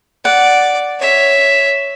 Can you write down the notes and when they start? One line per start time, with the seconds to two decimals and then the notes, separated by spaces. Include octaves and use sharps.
0.25 D5 F#5
1.00 C#5 E5